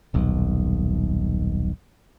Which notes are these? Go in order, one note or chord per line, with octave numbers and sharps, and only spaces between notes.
D#1 B1